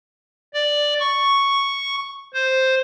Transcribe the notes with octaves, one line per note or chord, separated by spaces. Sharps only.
D5
C#6
C5